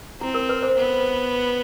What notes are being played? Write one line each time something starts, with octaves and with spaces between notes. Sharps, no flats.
C4 E4
A#4
B4
C5
B3